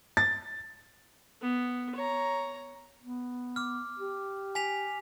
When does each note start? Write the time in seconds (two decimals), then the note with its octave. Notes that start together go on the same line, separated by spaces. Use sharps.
0.17 A6
1.42 B3
1.95 C#5 A#5
3.02 B3
3.56 D6 F6
3.99 G4
4.55 G#5 B6 F7